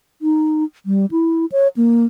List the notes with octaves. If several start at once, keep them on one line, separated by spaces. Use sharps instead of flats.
D#4
G3
E4
C#5
A#3